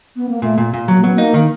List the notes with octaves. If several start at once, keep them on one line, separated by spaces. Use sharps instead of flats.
B3
A#3
A#2 A3
A#2
A#2
F#3 A#3
F#3 B3
A#3 D#4
D#3